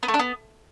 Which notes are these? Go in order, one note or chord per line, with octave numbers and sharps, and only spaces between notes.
B3
A3
D4
B3